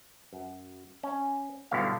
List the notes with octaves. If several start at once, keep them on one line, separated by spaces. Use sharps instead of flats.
F#2
C#4
B1 G2 B2 D3 E4 F5